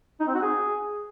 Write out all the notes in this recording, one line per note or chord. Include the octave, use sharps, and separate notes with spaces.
D#4
C4
F#4
G#4